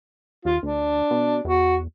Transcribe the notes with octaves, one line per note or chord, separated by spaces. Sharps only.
D#2 F4
D2 D4
B2
E2 F#4